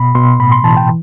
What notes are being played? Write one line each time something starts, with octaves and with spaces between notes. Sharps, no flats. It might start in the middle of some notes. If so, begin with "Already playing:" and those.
Already playing: B2 B5
B2 C6
A2 B5
C6
E3 A5
G5